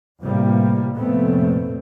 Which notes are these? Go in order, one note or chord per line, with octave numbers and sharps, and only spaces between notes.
A1 C3 G3 A#3
F1 A#2 A3 B3 C4